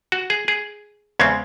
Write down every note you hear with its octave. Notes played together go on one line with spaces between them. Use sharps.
F#4
G#4
G#4
E2 C#3 G#3 C4 C#4